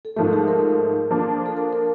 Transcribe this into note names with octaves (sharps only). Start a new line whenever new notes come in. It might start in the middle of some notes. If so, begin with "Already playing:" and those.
A4
G#2 F3 A3 A#4
G#4
A#4
F3 A#3 D4
A4
A#4
A#4